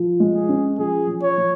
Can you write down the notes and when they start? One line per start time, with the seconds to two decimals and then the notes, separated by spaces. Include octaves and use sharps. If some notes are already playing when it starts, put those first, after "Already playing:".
Already playing: F3
0.20 G#3
0.35 G#4
0.49 C#4
0.79 F3 G#4
1.07 F3
1.23 C#5
1.38 F3